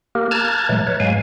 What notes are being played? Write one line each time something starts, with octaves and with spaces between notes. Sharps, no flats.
A#3 G4 A#4
A5 A#5 F6 F#6 G#6 A6
A#2 E3 F#3 G#3 A3
B4 C#5
G#2 F#3 G#3 F5 G#5